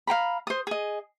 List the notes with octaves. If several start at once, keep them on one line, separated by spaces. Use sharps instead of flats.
F5 G5 A#5 B5
C5 D#6
G#4 D#5